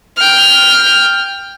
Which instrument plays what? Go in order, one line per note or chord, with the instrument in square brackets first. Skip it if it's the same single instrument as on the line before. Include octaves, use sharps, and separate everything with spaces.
[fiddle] G5 F6